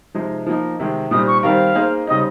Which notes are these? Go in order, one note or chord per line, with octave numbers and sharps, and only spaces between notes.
C3 F3 G#3 D#4
F3 A#3 D#4
C3 D#3 G#3
A#2 G3 C4 D#4 D#6
C#6
D#3 G3 C4 D#4 A#4 F5
A#3 D#4 G#4 C5
C#3 G3 C4 D#4 D#5